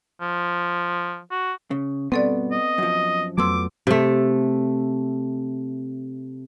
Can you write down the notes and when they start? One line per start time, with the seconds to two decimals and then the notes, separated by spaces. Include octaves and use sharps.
0.21 F3
1.31 F#4
1.71 C#3
2.12 G2 B2 B3 C4 A4 D5
2.51 D#5
2.78 F#2 F3
3.38 F2 F#3 A3 B3 C6 D6 E6
3.87 C3 A3